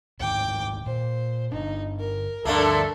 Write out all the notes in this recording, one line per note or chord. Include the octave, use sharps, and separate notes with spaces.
D1 G#2 D#3 G5 D6
A#2 C5
G1 D4 D#4
A#4
D2 G2 D3 A3 A#3 A4